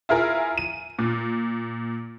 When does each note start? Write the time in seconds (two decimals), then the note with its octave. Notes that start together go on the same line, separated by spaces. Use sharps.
0.09 E4 F4 G#4 A#4
0.58 D#7
0.99 A#2